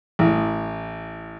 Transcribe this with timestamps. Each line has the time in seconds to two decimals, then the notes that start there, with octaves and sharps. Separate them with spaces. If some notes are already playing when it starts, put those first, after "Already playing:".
0.19 A1